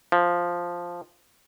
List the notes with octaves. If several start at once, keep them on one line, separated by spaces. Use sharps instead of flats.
F3